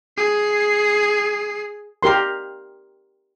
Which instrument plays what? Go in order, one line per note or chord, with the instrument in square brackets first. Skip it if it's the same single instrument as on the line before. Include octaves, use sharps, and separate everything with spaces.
[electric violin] G#4 C7
[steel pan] G4 A#4 C6